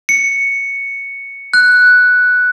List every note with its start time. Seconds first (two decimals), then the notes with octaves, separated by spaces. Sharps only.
0.09 C#7
1.54 F#6